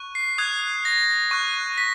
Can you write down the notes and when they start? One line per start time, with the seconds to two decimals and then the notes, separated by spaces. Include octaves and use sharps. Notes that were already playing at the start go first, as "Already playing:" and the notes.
Already playing: C#6 F#6
0.15 C7
0.38 D#6 F#6 G#6
0.85 A#6
1.31 C#6 F#6
1.78 B6